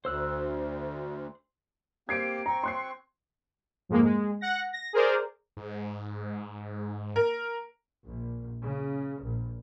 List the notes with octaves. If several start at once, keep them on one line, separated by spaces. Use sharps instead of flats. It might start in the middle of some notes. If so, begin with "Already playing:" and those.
D2 C5 E6 F#6
A#3 C4 G4 G#6 C7 D7
C4 A#5 C#6
C6 F#6 C7
F2 G#2 G#3 A#3
G#3
F#5 A#6
A#6
G#4 A#4 C5 D5
G#2
A#4
A#1
C#3
A#1